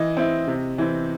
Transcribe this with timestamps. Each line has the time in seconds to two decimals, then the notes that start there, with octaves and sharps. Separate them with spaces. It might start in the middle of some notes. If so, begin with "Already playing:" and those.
Already playing: E3 D#5
0.17 C4 E4
0.47 C3
0.78 E3 C4